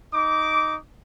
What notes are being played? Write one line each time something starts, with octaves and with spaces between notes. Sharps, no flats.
D#4 D6